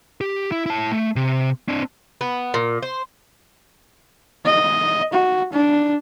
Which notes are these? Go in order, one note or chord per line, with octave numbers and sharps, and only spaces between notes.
G4
E4
E4 A5
A3
C3
C4 D4
B3
A#2
C5
D#5
F#4
D4